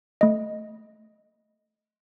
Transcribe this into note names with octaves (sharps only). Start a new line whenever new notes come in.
A3 D#5